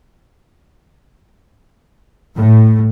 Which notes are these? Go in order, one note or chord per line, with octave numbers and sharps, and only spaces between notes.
A2